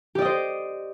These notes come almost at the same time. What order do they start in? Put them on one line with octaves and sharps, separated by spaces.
G4 D5 D#5 C5